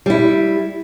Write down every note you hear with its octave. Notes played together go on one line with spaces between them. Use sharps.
G3 E4